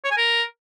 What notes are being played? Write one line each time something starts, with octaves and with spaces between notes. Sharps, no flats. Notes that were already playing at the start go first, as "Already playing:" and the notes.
C#5
G#5
A#4